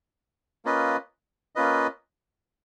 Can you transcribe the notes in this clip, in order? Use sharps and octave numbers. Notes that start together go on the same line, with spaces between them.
A#3 C#4 F4 B4 D#5
A#3 C#4 F4 B4 D#5